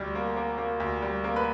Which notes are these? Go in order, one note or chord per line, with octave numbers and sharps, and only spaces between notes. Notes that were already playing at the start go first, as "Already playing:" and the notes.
Already playing: D2 G3
A#3
A#3
A#3
D2
G3
A#3
B4